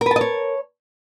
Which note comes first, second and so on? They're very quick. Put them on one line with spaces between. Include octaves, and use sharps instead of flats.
A#4 B4 A5 D#5 C#5